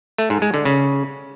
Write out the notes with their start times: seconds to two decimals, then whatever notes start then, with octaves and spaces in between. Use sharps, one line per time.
0.18 A3
0.30 G#2
0.42 G#3
0.54 D3
0.65 C#3